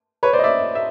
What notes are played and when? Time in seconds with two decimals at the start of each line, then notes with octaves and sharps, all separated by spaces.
0.23 B4 C#5
0.33 C5 D5
0.39 D#5
0.44 D5 E5
0.75 E5